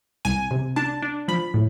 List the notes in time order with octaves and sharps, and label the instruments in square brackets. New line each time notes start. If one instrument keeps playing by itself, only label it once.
[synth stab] C2 G#5
C3
D4 A5
D4
F3 B5
A2